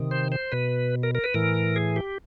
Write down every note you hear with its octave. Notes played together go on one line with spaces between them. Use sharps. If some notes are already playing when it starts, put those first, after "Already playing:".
Already playing: C3 D#3
C5
C5
B2 B4
A#4
A#4
B4
A2 E3 A#4
G#4
G4